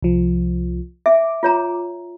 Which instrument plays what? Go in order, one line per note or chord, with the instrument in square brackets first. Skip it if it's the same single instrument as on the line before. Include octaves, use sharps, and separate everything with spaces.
[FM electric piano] C2 F3
[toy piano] E5 [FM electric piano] D6
[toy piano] F4 C#5 A#5